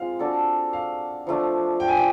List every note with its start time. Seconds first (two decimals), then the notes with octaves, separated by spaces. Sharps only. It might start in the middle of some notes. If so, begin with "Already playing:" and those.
Already playing: G#3 C4 F4 F5
0.19 D4 F#4 A4 D5
0.73 F5
1.27 F3 A3 D4
1.80 G5
1.88 G#5
1.96 G5